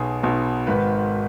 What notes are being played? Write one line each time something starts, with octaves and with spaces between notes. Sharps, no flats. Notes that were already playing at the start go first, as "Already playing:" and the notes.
Already playing: B1 B2 G#4
B1 B2
G#1 G#2 D#3 B4